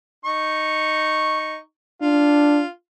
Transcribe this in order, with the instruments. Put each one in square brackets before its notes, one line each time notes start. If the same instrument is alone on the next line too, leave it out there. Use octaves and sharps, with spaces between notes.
[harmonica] D#4 C#6
[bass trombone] D4 [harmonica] F4